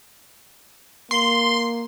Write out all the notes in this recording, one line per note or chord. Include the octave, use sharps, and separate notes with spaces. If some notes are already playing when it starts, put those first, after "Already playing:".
A#3 C6